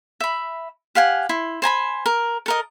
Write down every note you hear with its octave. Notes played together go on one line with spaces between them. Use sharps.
E5 B5
G4 F5 F#5 G#5
E4 C6
C5 G#5 A#5 B5
A#4
A4 A#4 D#5